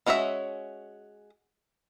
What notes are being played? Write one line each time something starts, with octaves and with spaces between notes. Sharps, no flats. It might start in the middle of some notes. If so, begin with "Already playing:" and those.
G#3 C#4 F#4 C5 E5